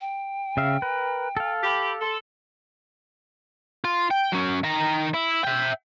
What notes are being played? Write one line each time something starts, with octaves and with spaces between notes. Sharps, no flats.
G5
C#3 E5 F5
A#4 B4
A4 F5
G4 B5
A4 C6
F4
G5
F#3 C#4
D#3 A#5
E4
E5 G5